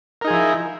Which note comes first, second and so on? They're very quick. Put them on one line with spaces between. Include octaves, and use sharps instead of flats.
A#4 D#4 G#4 F3 E4